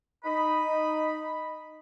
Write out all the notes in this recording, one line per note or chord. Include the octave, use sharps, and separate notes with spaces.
D#4 D#5 B5